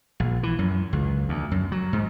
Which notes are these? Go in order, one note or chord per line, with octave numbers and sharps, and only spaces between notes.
A#1
E3
F#2
C#2
D2
F#2
F#3
G#2